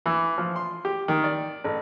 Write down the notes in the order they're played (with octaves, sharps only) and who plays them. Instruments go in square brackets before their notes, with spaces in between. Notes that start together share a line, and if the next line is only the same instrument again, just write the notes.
[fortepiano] E3
F3
C6
G4
D#3
D5
A1